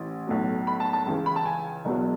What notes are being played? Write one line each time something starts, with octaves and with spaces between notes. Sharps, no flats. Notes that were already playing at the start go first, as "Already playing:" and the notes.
Already playing: A1 E3
B1 A2 F#3
B5
A5
A5
C#2 C#3 E3
B5
A5
G#5
E1 E2 B2 F#3